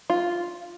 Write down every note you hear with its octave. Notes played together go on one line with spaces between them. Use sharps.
F4